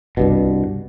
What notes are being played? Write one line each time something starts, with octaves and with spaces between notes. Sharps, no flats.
C2 G2 B2